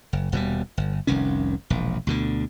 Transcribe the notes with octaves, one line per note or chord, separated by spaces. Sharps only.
F#1
D#1 B2 F#3 G3
G1
F1 C2 D#3 C#4
E1 A#1
D2 B2 D3